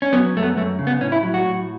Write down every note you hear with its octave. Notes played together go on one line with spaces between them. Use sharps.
C#4
F#3 B3
F#2 A3
B3
F#2 A3
C#3
B3
A2 C#4
E4
F#3
F#4
A2